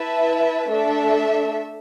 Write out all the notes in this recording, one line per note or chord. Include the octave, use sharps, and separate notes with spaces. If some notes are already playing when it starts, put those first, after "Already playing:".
Already playing: E4 B4 E5 A5
A3 D4 A4 E5